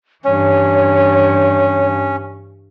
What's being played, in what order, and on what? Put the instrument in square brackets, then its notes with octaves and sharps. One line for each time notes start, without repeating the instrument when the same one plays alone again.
[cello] G2 E3 [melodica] C#4 [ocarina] C#5